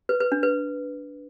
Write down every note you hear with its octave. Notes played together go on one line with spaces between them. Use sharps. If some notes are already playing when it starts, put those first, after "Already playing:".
B4
B4
D4
B4